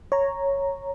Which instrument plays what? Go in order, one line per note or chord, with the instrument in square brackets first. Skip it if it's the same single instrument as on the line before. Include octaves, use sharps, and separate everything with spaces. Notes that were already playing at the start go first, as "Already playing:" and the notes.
[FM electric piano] C#5 A#5